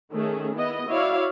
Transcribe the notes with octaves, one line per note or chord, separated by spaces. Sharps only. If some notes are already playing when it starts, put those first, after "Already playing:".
D#3 A3 C#4 G#4
B3 E4 D#5
E4 F#4 C#5 D5 E5 F5